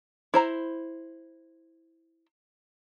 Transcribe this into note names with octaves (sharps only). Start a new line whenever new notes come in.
E4 C5 A#5